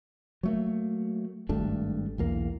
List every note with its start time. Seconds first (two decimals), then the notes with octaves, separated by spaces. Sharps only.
0.43 F#3 A3 A#3
1.49 G#1 G2 A3 D4
2.18 B1 E2 A#3